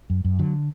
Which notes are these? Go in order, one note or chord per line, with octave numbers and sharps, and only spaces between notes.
F#2
F#2
D3 F#3